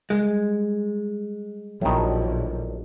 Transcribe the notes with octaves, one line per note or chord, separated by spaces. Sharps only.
G3 G#3
A#1 A2 D#3 F#3 B3 D4